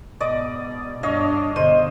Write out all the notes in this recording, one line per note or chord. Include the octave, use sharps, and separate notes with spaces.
G#2 B2 D5 D#5 D6
G2 D4 C#5 D#5 F5
B2 D3 C5 D#5